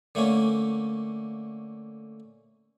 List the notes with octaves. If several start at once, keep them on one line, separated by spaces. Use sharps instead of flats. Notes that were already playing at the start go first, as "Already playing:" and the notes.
D3 A3 A#3 C#4